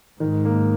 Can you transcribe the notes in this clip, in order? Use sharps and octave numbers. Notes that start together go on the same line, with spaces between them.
G#2 D#3
A#3